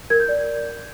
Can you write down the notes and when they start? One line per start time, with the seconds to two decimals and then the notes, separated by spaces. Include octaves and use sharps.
0.10 A#4 G#6
0.20 G6
0.29 D5